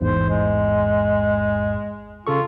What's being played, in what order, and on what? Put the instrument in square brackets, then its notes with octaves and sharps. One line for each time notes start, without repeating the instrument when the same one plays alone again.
[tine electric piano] A1 E2 G#2 [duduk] C5
[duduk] G#3
[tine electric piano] C#3 A4 C#6 [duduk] F4